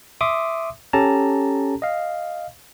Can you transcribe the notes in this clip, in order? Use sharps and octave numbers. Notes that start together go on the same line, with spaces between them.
E5 C6 D6 D#6
C#4 G4 A4 A5 A#5
D#5 F5